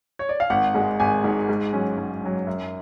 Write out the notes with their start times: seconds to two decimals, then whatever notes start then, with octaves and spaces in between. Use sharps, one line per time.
0.19 C#5
0.29 D5
0.40 F5
0.50 G#1 F#5
0.74 G#2 G#3
1.00 G#1 G#5
1.24 G#2 G#3
1.49 G#2
1.73 F#3 C#4
1.98 G#2
2.22 F#3 C#4
2.47 F#2